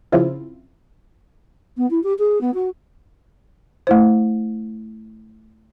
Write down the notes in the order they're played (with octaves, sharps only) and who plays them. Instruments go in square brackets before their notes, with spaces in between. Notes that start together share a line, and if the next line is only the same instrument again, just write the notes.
[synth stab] C#3 F3 C4 E4 F4
[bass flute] B3
E4
G4
G#4
B3
F#4
[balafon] A3 E4 C5